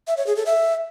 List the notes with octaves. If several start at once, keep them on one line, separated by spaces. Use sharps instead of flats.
E5
C#5
G#4
A4
E5